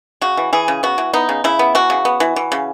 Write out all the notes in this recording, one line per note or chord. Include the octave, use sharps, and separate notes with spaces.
C#3 F#4
E3
E3 G#4
C#3
B3 F#4
E3
B3 D#4
C#3
C#3 E4
B3
E3 F#4
C#3
B3
E3
E3
C#3